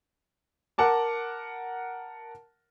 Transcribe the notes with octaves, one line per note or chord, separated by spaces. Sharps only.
A#4 F#5 A5 D6